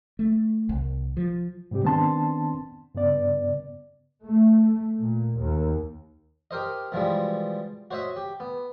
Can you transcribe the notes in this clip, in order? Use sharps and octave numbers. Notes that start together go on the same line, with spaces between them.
A3
C2
F3
G#2 C3 G3 C4 G4
D#3 B3 C4 D4 A5 C6
G2 C#3 B3 D5
A3
A#2
D#2
G4 A#4 C5 D#5
B2 E3 F3 G3 G#3
F#4 C5 C#5 D#5 E5
G4
B3